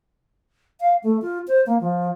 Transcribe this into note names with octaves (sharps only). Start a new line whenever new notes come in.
F5
A3
F4
C5
A#3
F3